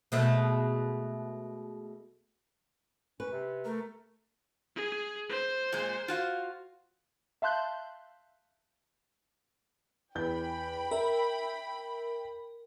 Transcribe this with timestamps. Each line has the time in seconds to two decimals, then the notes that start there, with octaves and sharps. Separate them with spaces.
0.12 B2 G#3 A3
3.20 C#4 B4
3.32 C3
3.65 A3 A#4
4.76 G#4
5.29 C5
5.72 A#2 G#3
6.08 F4 F#4 F5
7.42 E5 F5 A5 C6 F#6 G6
10.15 E2 G5 B5 G6
10.91 A#4 E5